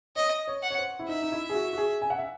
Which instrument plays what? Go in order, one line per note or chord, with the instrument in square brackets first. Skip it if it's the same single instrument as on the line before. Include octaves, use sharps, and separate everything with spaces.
[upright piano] C#5 [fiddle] D#5
[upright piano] C#5
[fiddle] F#5
[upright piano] C#5
C5
E4
[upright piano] D#4 [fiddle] E5
[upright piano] D#4
E4
G#4
F#4
F#4
G#4
G#5
F#5
E5